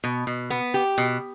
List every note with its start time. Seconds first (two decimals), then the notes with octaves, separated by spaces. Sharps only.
0.04 B2
0.27 B2
0.50 B3
0.74 G4
0.98 B2